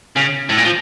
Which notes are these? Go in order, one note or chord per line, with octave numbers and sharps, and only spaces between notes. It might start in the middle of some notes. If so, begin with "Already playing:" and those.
C#3
A2
A#2
F3